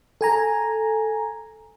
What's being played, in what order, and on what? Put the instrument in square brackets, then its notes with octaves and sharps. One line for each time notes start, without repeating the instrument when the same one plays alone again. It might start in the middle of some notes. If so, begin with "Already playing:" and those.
[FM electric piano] A4 G#5 A#5